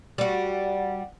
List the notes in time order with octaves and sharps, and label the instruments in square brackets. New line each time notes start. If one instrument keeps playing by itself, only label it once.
[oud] G3 F#4